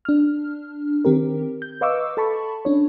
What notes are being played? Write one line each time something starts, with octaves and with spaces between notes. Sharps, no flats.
D4 F6
D#3 C4 G4 A#4
G6
B4 D#5 F5 C#6 D6 E6
A4 A5 B5 C#6
C#4 D4 C#5